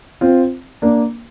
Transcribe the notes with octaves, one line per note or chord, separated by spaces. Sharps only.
C4 F4
A#3 D4